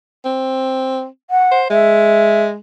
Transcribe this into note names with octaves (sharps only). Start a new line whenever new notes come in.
C4
F#5
C5
G#3 E5